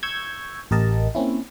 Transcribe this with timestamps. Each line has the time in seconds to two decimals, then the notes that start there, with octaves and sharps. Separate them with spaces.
0.03 C#6 E6 G6 G#6
0.71 A1 G4 A#4 D#5 A5
1.15 A#3 C4 C#4 E4